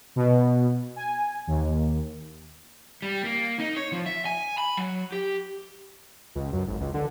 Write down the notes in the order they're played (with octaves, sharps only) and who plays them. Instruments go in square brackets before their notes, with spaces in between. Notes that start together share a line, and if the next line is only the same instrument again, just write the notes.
[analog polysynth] B2
G#5
D#2
[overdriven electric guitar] G3
A#3
D#4
C#5
F3
E5
G#5
B5
F#3
G4
[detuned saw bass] C#2
F#2
G#1
C#2
D3